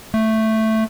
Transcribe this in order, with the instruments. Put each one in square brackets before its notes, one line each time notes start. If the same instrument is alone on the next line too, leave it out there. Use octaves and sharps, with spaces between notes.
[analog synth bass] A3